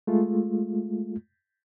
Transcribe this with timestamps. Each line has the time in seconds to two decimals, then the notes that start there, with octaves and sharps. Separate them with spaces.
0.07 G#3 A3 F4